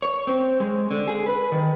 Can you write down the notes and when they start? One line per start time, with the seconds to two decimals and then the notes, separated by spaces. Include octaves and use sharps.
0.02 C#5
0.27 C4
0.60 G#3
0.91 D3
1.08 G#4
1.26 B4
1.52 D#3